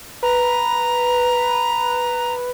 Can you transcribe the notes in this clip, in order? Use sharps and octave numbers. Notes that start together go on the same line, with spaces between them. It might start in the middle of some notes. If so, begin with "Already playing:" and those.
B4 A#5